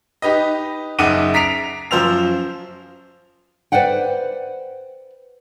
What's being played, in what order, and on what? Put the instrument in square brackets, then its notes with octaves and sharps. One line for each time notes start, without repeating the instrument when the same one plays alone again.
[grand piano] D#4 G4 B4 D#5
F#1 D#4 E5 F#5 D6 D#7
A#5 B6 C7 D7 F7
F#2 F3 C5 E6 F7
[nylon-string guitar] B4 C5 D5 F#5 G5